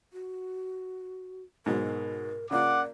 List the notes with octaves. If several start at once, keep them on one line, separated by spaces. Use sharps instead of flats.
F#4
G#2 B2 F#3 A#4
C#3 A#3 F4 D5 F#5 D6